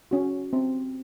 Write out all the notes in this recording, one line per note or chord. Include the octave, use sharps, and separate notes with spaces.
C#4 F#4
C4